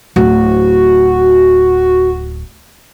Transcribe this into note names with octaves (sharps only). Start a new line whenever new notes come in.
D1 F#4